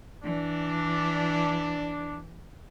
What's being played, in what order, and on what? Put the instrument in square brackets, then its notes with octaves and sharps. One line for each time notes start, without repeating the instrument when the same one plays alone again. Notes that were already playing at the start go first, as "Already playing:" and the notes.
[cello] E3 [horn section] D4